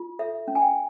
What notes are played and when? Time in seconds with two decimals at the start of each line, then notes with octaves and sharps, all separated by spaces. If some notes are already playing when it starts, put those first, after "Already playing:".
Already playing: F4
0.19 A4 E5
0.48 C#4
0.55 G#5
0.62 G5